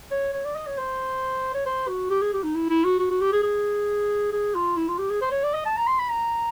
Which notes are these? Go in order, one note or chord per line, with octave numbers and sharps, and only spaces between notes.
C#5
C#5
D5
D#5
C#5
C5
C#5
C5
F#4
G4
G#4
G4
D#4
E4
E4
F#4
F#4
F#4
G4
G#4
G#4
G#4
F4
E4
F4
G4
G#4
C5
C#5
D5
D#5
A5
A#5
C6
B5
A#5